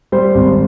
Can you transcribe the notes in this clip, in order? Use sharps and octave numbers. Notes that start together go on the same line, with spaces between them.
G3 C5
G#1